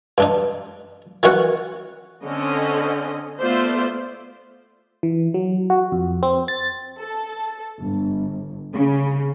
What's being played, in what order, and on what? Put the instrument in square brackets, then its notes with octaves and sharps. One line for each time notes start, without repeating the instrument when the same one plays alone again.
[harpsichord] G2 D4 D#4
D#3 E3 C#4 F#4 C#5 F#5
[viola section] D3 C4 C#4 D#5
A3 B3 F4 C5 D5 E5
[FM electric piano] E3
F#3
F#4
F2
C4
A6
[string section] A4
G1
C#3